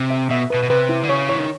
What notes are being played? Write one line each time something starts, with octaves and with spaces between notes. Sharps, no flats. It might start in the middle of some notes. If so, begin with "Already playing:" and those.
Already playing: C3
E5
B2 E5
B2 B4
B2
C3 B4
E4
D3
C#3 C#5
E3 C#5
D#3